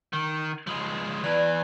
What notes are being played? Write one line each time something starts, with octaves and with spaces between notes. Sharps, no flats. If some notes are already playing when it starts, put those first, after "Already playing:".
D#3
F3 G#3
E2 E3 D5